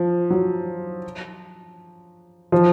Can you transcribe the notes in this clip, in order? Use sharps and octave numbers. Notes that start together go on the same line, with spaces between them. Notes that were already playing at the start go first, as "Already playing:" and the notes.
Already playing: F3
F#3
F3